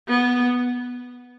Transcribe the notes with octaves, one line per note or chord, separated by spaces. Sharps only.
B3